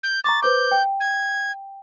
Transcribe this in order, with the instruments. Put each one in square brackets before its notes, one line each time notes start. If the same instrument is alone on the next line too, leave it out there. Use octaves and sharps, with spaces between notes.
[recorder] G6
[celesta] A#5 C#6 D6 [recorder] A6
[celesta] B4 C5 D6 [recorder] G6
[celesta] G5
[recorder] G#6